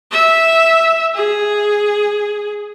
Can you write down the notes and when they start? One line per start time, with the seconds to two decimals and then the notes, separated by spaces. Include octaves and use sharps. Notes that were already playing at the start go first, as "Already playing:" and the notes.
0.11 E5
1.15 G#4